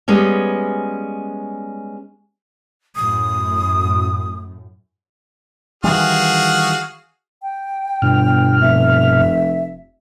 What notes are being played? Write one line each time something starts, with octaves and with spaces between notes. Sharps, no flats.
G3 G#3 B3 C#4
F#2 A2 D#6
D#3 E3 G3 F#4 G#4 F5
G5
G1 G2 B2 F6
F1 E5